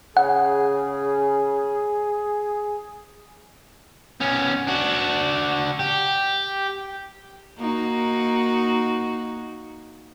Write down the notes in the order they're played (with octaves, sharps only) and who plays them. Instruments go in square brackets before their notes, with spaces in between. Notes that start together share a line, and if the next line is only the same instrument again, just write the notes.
[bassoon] C#3 [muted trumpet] G#4 [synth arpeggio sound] F#5
[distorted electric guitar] B3 C#4
D4 F#4
G4
[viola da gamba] A#3 D#4 F#4